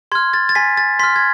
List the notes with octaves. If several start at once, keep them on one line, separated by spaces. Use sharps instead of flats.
C6 F6 G#6
A6
A6
G#5 B6
A6
C6 F6 B6
G#6